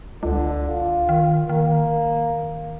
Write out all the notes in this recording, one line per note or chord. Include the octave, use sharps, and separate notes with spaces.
C#2 D3
F4
D#3
D#3 A#3